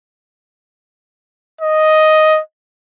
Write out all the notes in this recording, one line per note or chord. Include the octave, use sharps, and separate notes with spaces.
D#5